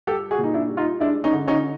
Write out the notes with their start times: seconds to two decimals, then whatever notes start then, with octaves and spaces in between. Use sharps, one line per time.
0.07 G3 G4 A4
0.31 F#4 G#4
0.38 A#2
0.44 D#4
0.54 D4 E4
0.69 G3
0.77 D#4 F4
1.00 G#3 D4 E4
1.24 C#4 D#4
1.32 D3
1.48 C#4 D#4